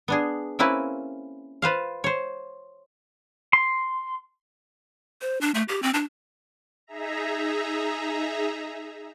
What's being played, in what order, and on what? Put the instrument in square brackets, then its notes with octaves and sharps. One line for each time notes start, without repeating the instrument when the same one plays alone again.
[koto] B3 D4 G#4
A#3 C4 C#4 E4 B4
F4 B4 C5 F5
C5 C#5
[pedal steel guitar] C6
[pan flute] C5
D4
A3
G4
C4
D4
[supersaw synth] D#4 G#4 E5 A#5